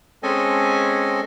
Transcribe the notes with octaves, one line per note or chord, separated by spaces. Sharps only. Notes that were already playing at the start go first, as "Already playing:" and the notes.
G#3 C4 C#4 A4 D#5 G#5